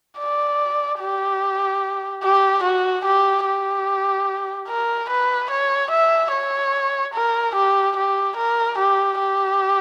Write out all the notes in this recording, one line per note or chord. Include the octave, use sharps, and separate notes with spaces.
D5
G4
G4
F#4
G4
G4
A#4
B4
C#5
E5
C#5
A#4
G4
G4
A#4
G4
G4